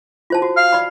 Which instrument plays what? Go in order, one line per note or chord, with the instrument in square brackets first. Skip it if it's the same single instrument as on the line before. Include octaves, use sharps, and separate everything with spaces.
[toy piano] F4 C5 A5
F#4
[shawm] F5
[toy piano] D5 B5